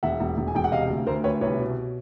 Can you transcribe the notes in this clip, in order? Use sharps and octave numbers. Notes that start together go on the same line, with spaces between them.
E1 E5 F#5
E1
E1
G#5
E1 G5
F#5
C3 D#5 F5
D2
D2 A#4 C5
D2 B4 C#5
C2 B4 C#5
B2